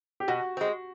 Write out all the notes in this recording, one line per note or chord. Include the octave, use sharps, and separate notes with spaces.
G4
B2 F#4
G#3 C4